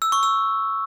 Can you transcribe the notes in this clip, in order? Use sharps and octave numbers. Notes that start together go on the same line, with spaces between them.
E6
C#6
E6